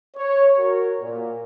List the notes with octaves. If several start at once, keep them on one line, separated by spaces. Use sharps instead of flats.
C#5
F#4 A#4
A#2